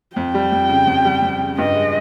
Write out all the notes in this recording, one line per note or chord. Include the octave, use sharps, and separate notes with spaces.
F2 G5
G3
F2
C#3
F2
G3
F2
C#3
G2 D#5
G#3